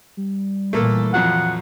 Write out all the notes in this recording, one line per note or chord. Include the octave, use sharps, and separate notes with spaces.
G3
A#2 E3 A3 A#3 A4
F2 F3 F#3 F#5